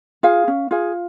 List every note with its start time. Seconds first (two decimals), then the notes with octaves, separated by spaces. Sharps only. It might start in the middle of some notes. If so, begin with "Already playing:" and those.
0.23 F4 G#4 F5
0.48 C#4
0.71 F4 G#4 F5